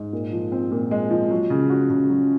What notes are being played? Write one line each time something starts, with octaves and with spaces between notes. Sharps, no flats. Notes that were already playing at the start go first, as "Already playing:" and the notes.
Already playing: G#2
A#2
F3
C4
A#2
G#3
F3
F#3
C#3
F#4
C#3
F#3